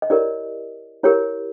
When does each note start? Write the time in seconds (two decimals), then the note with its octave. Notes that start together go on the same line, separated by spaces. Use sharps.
0.02 D#5
0.10 E4 G4 A#4 C#5 D5
1.03 E4 G4 A#4 C#5